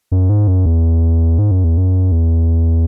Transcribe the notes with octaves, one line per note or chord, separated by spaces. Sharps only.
F#2
G#2
F#2
E2
G#2
F#2
E2
F#2
E2